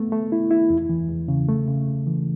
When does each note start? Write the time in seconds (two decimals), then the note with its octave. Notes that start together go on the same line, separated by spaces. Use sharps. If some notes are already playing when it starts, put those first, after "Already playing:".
Already playing: A3 B3
0.12 A3
0.32 E4
0.51 E4
0.70 E2
0.89 E3
1.09 E2
1.28 C#3
1.49 A3
1.67 C#3
1.88 C#3
2.07 E3